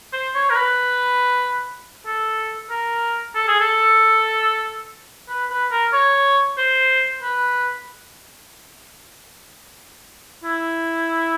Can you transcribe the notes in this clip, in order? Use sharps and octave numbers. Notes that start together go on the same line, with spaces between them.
C5
C#5
A#4
B4
A4
A#4
A4
G#4
A4
B4
B4
A#4
C#5
C5
B4
E4